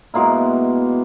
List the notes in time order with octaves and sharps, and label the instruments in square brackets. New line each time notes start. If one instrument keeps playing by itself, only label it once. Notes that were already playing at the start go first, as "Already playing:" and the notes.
[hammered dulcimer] B2 G#3 A#3 E4